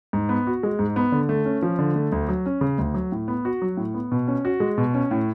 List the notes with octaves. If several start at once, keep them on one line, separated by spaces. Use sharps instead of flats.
G#2
B3
F#4
G#3
G#2
B3
D3
A3
C#4
F3
D3
A3
D2
F#3
C#4
C#3
D2
F#3
A2
B3
F#4
F#3
A2
B3
B2
C#4
F#4
G#3
B2
C#4
A2